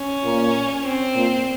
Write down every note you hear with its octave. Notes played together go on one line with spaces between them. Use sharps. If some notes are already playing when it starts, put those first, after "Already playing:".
Already playing: C#4
A#2 A#3
C4
A#2 A#3